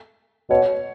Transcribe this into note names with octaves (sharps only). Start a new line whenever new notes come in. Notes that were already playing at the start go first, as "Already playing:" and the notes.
B2 C#5